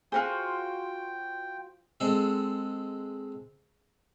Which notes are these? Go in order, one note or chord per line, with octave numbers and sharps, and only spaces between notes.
F4 F#4 G#4 C5 G5
G#3 C4 A4